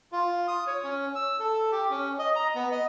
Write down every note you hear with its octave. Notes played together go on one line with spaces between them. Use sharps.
F4
D#6
C#5
C#4
E6
A4
G4
C#4
D#5
A#5
B3
D#5